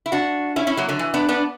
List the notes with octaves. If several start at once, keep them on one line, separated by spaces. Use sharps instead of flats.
E4
D4 F#4
C#4 E4
C#4 E4
F#3 A#3
D3 F#3
E3
B3 D4
B3 D4